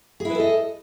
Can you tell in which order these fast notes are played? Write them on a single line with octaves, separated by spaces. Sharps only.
G#4 E4 B4 A4 D#5